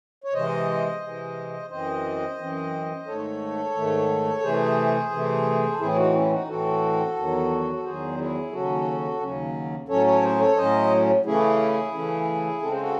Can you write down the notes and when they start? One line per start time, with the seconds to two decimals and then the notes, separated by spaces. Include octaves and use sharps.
0.24 C#5
0.33 C3 E3 G#3 C5 D#5
1.02 C3 E3 G#3
1.70 F#2 E3 C4 C5 D#5
2.38 F#2 E3 C4
3.06 G#2 D#3 A3 A4 C#5
3.75 G#2 D#3 A3
4.37 A4
4.43 C3 E3 A3 G#4 C5
5.11 C3 E3 A3
5.72 A4
5.79 A2 E3 C4 E4 G#4
5.96 D#4 F#4
6.13 C#4 E4
6.31 D#4 F#4
6.47 A2 E3 C4 F#4 A4
7.16 E2 D#3 F#3
7.73 A4
7.84 E2 D#3 F#3 G#4 C5
8.18 E4 G#4
8.52 D#2 C#3 F#3 C#4 F#4 A4
9.21 D#2 C#3 F#3 C#4
9.88 A2 F#3 C#4 A4 C#5
10.06 A4 C#5
10.23 G#4 C5
10.40 A4 C#5
10.57 A2 F#3 C#4 C5 D#5
11.25 C#3 E3 A3 C#4 E4 G#4
11.94 C#3 E3 A3 C#4
12.62 C#3 G#3 C4 A4
12.72 C5
12.81 F#4 A4